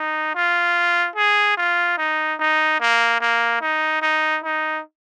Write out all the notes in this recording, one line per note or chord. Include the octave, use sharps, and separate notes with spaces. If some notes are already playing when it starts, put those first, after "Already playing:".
Already playing: D#4
F4
G#4
F4
D#4
D#4
A#3
A#3
D#4
D#4
D#4